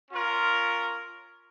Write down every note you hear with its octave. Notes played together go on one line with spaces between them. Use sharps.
C#4 F4 A#4